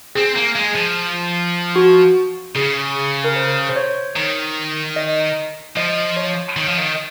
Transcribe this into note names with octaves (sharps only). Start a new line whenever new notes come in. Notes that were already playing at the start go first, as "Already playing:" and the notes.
C4 G#4
A#3
G#3
F3
F#4
C#3 G#4
A#4
C5
C5
C#5
D#3
D#5
F3 D#5
C#5
D#3
F3
D#3